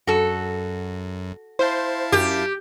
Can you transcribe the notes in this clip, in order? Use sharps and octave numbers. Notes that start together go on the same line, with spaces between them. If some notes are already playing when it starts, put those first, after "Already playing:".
F#2 F#4 A4
E4 C5 F5 A5
F#2 G4